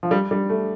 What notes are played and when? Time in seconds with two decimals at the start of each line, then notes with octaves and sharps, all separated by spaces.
0.03 F3
0.11 G3
0.31 G3
0.50 A3